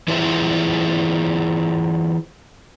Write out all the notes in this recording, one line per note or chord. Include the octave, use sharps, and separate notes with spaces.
E3 E4 F4 G#4 C5 E5